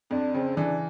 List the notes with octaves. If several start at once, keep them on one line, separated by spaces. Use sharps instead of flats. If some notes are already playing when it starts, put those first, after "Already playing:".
F2 D4
C#3 C4
E3 D4